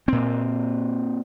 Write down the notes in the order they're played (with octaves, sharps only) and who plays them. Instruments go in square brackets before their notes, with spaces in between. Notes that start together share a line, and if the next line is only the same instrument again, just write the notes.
[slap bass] A#2 C4